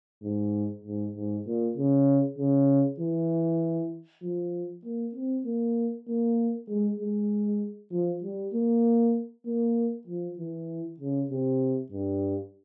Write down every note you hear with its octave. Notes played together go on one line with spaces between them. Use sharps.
G#2
G#2
G#2
A#2
C#3
C#3
E3
F3
A#3
C4
A#3
A#3
G#3
G#3
F3
G3
A#3
A#3
F3
E3
C#3
C3
G2